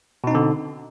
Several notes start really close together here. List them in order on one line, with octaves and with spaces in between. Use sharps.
B2 D#4 C4 D3